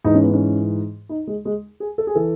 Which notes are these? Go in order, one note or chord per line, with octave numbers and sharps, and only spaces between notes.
G#2 E3 D#4
C#4
B3
C#4
D#4
G#3
G#3
G#4
A4
G#4
E3 A4